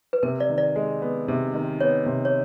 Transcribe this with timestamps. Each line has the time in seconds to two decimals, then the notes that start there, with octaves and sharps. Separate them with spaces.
0.13 B4
0.23 C3 A#4
0.40 D5
0.49 D#3
0.58 D5
0.76 G#3
1.02 B3
1.28 C3
1.54 D#3
1.80 B3 C#5
2.06 C3
2.25 C#5